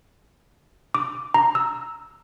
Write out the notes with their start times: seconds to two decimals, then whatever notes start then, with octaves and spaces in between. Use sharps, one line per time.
0.94 D6
1.34 A#5
1.55 E6